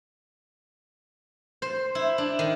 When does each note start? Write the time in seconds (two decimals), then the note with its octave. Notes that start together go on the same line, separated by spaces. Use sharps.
1.62 C5
1.95 E4
2.18 D4
2.39 D#3